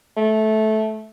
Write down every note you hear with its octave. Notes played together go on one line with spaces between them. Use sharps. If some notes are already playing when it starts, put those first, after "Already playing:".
A3